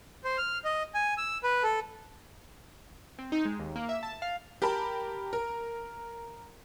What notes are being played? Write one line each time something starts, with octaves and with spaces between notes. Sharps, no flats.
C5
F6
D#5
G#5
E6
B4
A4
C4
D#4
G#3
D#2
A#3
E5
A5
F5
G4 A#4 A5 B5
A#4